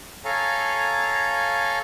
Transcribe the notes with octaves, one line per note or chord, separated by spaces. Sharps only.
A4 C#5 F5 G#5 A#5